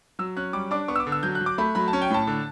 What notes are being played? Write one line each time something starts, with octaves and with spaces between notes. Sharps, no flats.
F#3 E6
C#4 F#6
G3 D6
D4 D6
B3 C#6
E6
D6
D3
E6
F#3 G6
F#6
F#3
D6
A3 B5
F#3 B5
A5
C#4
G5
A2 A5
D3